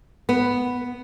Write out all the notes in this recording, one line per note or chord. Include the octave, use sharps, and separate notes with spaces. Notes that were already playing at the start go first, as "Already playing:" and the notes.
B3